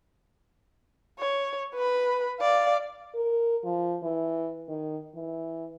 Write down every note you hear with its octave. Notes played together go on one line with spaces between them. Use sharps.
C#5
B4 B5
D5 F5
A#4
F3
E3
D#3
E3